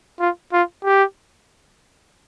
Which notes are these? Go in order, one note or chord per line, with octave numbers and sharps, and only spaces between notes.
F4
F4
G4